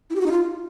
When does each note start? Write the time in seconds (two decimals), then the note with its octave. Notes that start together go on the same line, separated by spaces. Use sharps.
0.10 E4
0.15 G4
0.21 F#4
0.26 D#4
0.31 F4